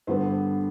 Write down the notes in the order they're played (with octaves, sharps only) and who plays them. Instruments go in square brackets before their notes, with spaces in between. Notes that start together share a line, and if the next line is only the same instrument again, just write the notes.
[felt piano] G2 D3 G3 B3 C5